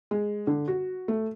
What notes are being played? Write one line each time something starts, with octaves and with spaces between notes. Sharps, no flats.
G#3
D3
F#4
A3